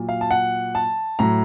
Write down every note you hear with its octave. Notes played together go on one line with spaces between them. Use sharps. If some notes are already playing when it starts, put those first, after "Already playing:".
Already playing: A#2 F#3
F5
A5
F#5
A5
A2 F#3 A#5